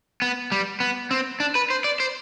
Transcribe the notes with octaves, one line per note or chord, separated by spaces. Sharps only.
B3
G3
B3
C4
D4
B4
C5
D5
C5